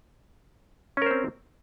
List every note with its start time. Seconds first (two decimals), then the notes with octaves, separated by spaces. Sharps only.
0.97 C#4
1.02 A#4
1.06 C5
1.11 C4